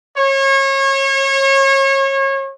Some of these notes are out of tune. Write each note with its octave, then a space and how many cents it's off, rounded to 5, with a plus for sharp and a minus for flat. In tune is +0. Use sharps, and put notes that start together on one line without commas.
C#5 -30